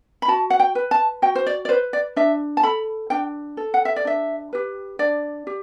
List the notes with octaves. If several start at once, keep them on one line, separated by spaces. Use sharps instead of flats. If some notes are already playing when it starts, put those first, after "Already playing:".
B5
F#4 A5
F#5
G5
B4
A5
F#4 G5
C5
D5
D5
B4 C5
D5
D4 E5
A5
A4 B5
D4 G5
A4
F#5
E5
D5
D4 E5
G4 B4
D4 D5
G4